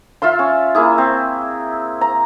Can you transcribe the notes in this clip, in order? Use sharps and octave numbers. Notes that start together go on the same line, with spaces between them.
F4 E5 F5 C6
C#4
A#3 E4 G#4
C4
A#5